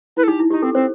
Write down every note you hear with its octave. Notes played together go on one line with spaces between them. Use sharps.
E4 B4
A4
D#4 G4
E4
D#4 G4
C4 A4
C4 C5